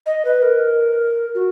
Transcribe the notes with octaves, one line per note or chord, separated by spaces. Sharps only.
D#5
B4
A#4
F#4